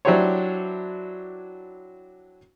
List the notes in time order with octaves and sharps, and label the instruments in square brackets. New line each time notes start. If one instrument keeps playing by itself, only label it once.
[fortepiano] F#3 D4 E4 G4 C5 C#5